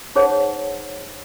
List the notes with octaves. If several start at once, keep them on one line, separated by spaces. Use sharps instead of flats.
D#4 G#4 C5 C#5 F#5